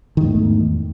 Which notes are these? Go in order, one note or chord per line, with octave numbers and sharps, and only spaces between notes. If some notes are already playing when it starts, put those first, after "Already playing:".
E2 G#2 D#3 A3